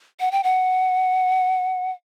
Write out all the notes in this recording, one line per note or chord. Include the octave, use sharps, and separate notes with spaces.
F#5
G5
F#5